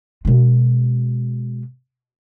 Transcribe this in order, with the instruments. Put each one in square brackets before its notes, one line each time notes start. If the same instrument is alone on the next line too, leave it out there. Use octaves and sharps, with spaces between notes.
[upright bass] B2 G#3